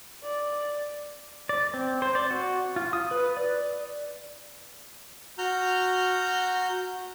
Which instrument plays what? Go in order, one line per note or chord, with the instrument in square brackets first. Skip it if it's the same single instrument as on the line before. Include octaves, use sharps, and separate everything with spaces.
[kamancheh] D5
[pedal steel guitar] D5
C4
C5
D5
F#4
F4
D#6
B4
D5
[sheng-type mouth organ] F#4 A#5 F6 G6